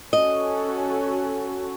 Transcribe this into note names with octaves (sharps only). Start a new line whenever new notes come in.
C#4 F#4 A4 D#5